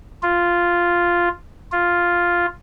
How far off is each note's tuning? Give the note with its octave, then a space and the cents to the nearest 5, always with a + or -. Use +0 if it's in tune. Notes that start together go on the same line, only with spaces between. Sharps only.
F4 -5
F4 +0